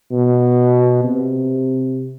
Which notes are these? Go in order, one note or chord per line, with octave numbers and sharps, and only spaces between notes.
B2
C3